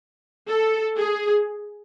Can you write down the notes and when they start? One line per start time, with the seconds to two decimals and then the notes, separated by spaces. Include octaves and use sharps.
0.49 A4
0.97 G#4